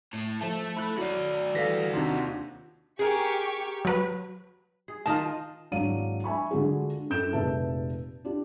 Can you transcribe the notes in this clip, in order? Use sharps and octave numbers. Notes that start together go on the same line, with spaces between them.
A2
F3 A3 A5
E4 B5 F#6
F#3 F#4 D5
E3 G3 A4 F5 A#6 B6
D#2 C3 D4 D#4 F4
G4 G#4 A#4 C#6 C#7
F#3 B4
G#4
D#3 F4 D#5 A5
G#1 F#3 D4 E4 F5 D#7
E5 G#5 B5 C#6
D3 G#3 D4 F4 F#4 G#4
F#2 E4 A4 G6 D7 E7
F1 A#2 G#4 B4 E5 A5
D4 F4 G4